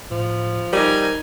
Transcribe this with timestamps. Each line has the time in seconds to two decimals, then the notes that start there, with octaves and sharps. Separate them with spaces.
0.11 A2 F3
0.73 G3 D#4 A#4 C5 G#5